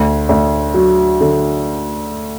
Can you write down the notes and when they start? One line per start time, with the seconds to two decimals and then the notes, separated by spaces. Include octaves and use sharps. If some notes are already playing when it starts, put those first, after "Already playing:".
Already playing: D2
0.29 D2
0.74 F#3
1.20 D3